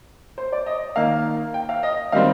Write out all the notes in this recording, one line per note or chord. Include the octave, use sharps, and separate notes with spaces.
C5
D5
D#5
D#3 A#3 F5
G5
F5
D#5
D#3 G3 C4 F5